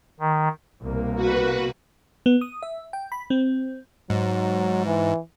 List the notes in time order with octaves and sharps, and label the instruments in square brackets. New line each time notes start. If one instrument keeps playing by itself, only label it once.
[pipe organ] D#3
[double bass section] C2 B2 A#3
[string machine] F#4 B4
[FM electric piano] B3
D#6
E5
G5
B5
C4
[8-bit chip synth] G#2 [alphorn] F#3
[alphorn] E3